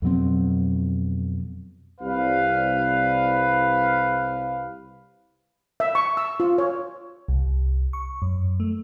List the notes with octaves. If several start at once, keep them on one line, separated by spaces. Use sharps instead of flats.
F2 B2 F#3 C4
C2 B4 F5
E5
C#6
E6
F4
C#5
C2
C#6
F#2
A3